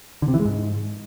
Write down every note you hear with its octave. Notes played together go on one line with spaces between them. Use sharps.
D3
C3
E3
G#3
G#2